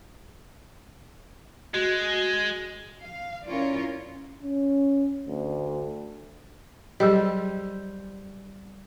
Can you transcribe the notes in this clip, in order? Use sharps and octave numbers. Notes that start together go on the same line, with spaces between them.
G#3 F#4
F5
C#4 E4 F4 A#4 C#5 D5
C#4
D2
F#3 G3 G#4 C5 D#5